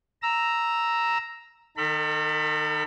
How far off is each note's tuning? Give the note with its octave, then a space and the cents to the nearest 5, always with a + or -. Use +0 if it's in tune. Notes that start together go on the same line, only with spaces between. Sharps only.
A#5 +0 E6 +0
D#3 -20 A4 +40 B5 +5